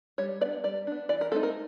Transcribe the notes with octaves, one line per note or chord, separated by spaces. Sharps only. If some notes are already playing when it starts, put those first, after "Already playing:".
G3 C#5
B3 D4 D5
G3 D5
B3 D4
E3 D5
A#4
A3 C4 D#4 A4
A#4